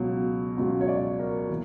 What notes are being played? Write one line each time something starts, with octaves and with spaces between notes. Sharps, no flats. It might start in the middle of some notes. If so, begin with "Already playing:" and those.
Already playing: C#2 B2 F#3
C#2 B2 F#3
C#5
D5
A#4
E3 A#3